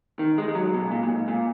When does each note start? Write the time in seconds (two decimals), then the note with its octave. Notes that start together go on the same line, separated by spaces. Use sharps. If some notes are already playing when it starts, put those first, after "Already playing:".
0.19 D#3
0.38 G#3
0.48 G#3
0.55 F#3
0.74 B2
0.85 G#2
0.91 A#2
1.03 A#2
1.09 G#2
1.28 A#2